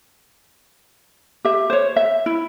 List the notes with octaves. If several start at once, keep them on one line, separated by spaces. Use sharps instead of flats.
G4 E5
C5 C#5
E5
E4